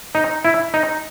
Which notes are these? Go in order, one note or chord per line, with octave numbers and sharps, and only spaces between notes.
D#4
E4
D#4